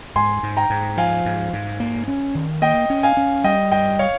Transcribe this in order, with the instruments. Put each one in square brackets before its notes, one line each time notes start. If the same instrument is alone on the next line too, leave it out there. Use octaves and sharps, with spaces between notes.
[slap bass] G#2 [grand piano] G#5 C6
[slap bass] G#2
[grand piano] G5 A#5
[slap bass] G#2
[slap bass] F3 [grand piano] F5 G#5
[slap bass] G#2
G#2
A#3
C#4
D#3
[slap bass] A#3 [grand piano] D#5 G5
[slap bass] C#4
[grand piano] F5 G#5
[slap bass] C#4
[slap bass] G3 [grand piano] D#5 G5
[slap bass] G2 [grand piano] D#5 G5
[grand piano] C#5 F5